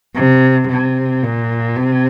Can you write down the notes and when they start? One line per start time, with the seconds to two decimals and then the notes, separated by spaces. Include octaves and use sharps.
0.15 C3
0.69 C3
1.23 A#2
1.77 C3